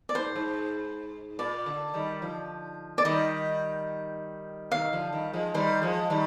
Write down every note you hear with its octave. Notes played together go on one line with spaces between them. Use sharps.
D5
G#2 C5
G#2
A#2 D5
D3
D#3 G3
D3 F3
G#3 D5
D#3 G3 D#5
C3 D#3 F5
D3 F3
D#3 G3
F3 G#3
D#3 G3 C5
F3 G#3
D#3 G3